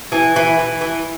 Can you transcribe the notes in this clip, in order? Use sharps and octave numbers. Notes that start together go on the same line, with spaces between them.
E3
E3
E3
E3